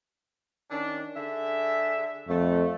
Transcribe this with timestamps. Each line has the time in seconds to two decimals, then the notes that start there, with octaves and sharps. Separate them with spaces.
0.71 D#3 C#4 D4
1.17 D3 G#4 E5
2.29 F2 A3